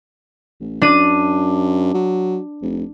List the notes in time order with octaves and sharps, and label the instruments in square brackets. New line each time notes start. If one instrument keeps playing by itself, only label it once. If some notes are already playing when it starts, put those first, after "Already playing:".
[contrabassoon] A1
[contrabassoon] F#2 [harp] D4 D#7
[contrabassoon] F#3
F1